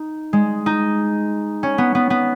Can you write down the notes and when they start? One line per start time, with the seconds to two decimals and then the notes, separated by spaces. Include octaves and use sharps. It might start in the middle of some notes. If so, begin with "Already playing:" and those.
Already playing: D#4
0.33 G#3
0.66 D#4
1.63 C#4
1.78 B3
1.95 B3
2.10 B3